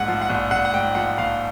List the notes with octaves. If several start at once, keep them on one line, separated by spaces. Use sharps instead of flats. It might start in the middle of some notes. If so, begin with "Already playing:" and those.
Already playing: A#1 G#2 F#5
F3
F#5
A#1
A#1 F#5
F#5
G#2 G5
F3 F#5
A#1 F5